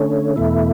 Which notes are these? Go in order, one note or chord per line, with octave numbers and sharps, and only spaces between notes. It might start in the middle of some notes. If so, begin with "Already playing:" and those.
Already playing: D3 A3 C#4
E2 B2 A3 E4